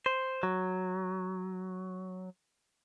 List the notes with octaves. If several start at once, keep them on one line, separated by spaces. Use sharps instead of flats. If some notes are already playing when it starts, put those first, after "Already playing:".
C5
F#3